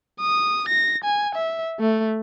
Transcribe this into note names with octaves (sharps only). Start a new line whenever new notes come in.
D#6
A#6
G#5
E5
A3